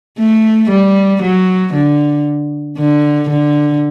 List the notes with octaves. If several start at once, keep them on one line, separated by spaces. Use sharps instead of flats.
A3
G3
F#3
D3
D3
D3